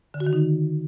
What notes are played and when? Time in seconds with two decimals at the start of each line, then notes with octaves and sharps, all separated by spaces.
0.14 D3
0.20 F#4
0.27 D#3
0.33 D#4